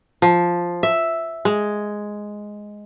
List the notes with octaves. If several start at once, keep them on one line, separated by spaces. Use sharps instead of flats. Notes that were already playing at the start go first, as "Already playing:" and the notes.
F3
E5
G#3